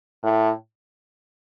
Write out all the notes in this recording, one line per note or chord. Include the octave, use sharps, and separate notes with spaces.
A2